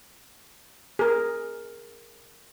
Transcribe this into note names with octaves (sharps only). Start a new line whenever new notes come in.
G#4 A#4